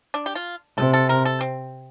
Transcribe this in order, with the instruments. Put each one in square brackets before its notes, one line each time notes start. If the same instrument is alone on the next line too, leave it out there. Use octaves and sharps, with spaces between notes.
[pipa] D4
G4
F4
[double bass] C3 [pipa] A4
[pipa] A4
A#4
A4
C4